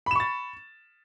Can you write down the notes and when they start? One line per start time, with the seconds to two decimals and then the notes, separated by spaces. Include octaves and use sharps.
0.06 B5
0.11 E7
0.15 C#6
0.20 A6